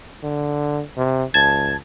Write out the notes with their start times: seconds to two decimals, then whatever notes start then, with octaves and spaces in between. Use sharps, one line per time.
0.23 D3
0.97 C3
1.34 C#2 A5 G#6